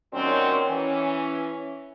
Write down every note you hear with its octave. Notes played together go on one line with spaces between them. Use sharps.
A#2 D#3 F#3 C4 C#4
E3 C#4